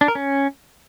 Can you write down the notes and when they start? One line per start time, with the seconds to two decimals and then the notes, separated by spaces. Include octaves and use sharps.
0.01 D4
0.08 A#4
0.15 C#4